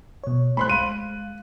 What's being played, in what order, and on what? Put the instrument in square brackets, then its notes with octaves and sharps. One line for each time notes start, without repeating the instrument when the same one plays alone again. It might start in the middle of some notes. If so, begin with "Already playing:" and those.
[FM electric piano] B2 C#5
[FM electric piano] A3 C5 [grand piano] B5 C6 F#6
[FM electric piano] G#3 F5 [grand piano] D#7